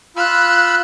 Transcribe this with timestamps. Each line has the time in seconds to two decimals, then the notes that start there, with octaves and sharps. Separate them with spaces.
0.17 F4 B5 E6 F#6